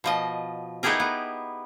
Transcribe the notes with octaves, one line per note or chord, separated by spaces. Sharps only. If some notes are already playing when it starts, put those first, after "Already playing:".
B2 F3 D#5
B3 D#4 E4 G4 G#4 A#4
B3